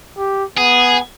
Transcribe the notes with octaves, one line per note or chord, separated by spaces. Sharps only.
G4
B3 G#4